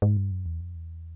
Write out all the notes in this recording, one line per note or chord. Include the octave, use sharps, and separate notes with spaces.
G#2
G2
F#2
E2
F2
E2